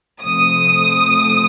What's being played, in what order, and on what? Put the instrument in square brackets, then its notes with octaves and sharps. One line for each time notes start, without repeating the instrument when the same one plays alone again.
[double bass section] C3 F3 A3 C4 [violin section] D#6